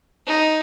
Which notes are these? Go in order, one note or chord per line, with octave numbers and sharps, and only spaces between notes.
D#4